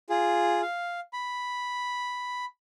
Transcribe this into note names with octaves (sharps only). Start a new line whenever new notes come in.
F4 G#4
F5
B5